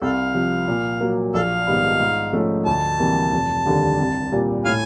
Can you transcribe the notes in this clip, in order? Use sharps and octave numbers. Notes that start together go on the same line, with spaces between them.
C2 A4 F5
C3 F3
A#2
F#3 A#3
A#1 A4 F5
G#2 D#3 G3 B3
G#2
F3 A3 C#4
D2 A5
C3 E3 G3 A#3
F1
D#2 D3 G3
C2
A#2 G3
A2 F5 G#5